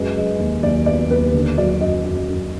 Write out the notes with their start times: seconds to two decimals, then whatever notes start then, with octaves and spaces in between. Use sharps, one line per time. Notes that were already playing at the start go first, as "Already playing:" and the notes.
Already playing: F#2 G#3 B4
0.17 G#3
0.39 D#2
0.63 D#2 D5
0.86 B3 D5
1.10 D#2 B4
1.34 D3
1.57 F#3 D5
1.80 F#2 D#5
2.05 F#2
2.28 F#2